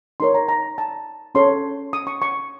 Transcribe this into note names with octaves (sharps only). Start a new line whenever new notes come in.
D#4 A#4 C#5 C6
A#5
A#5
A5
C#4 A4 C#5 C6
D#6
C#6
C#6